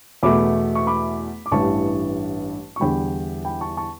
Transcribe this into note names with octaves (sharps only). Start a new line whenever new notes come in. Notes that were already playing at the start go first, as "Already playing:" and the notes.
E2 B2 A3 B5 D6
C#6
B5 D6
D6
A1 G2 E3 A5 C#6
C#6
E2 D3 G3 G5 B5
G5 B5
A5 C#6
A5 C#6